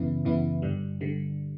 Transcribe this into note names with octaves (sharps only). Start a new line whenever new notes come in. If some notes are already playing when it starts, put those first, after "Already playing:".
Already playing: F#2 C#3 E3 B3 E4
F#2 C#3 E3 B3 E4
G2 D3 G3
D3 G3